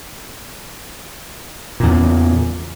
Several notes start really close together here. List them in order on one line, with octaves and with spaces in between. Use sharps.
A#2 E2 C#3